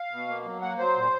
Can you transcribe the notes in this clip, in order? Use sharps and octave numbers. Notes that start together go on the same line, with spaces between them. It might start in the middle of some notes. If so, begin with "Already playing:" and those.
Already playing: F5
B2
A#3
F#3
A#3 F#5
F#3 C5
A#2